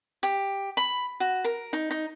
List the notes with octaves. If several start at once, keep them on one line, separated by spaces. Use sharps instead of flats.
G4
B5
F#4
A#4
D#4
D#4